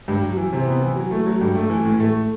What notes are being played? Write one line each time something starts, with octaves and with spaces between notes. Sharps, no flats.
G2
F#3
E3
C3
B3
E3
F#3
A3
F#3
G2
A3
E3
A2
A3